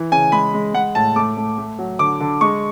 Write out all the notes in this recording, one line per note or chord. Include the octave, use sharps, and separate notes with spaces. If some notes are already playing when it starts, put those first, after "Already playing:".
Already playing: E3
C#3 G#5
G#3 B5
G#3
G#3 F#5
A2 A5
A3 D6
A3
A3
F#3
D3 D6
D3
G#3 C#6